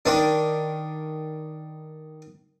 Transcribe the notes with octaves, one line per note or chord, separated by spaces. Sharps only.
D#3 D4